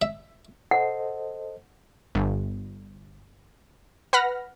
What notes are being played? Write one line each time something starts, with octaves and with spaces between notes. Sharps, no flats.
E5
A4 C5 D#5 F#5
G1
B4 F#5 B5 F6 A#6